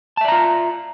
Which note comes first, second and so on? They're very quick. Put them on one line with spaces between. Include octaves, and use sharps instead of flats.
A5 E5 D5 A#5 F4